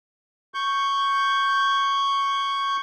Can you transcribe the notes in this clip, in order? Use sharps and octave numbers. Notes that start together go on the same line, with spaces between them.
C#6 G6